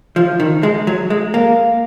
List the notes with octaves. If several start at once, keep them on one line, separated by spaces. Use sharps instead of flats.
F3
D#3
G#3
F#3
G#3
A#3